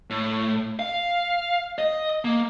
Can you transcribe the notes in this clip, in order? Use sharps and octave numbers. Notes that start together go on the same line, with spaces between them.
A2
F5
D#5
A#3